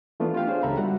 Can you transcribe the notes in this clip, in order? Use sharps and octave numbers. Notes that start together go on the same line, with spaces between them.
E3 A3 B3 D4 F4
F4 G4 F5 G5
D4 G#4 C5 C#5
C#2 G4 A4 E5 A#5 B5
G3 F#4 F#5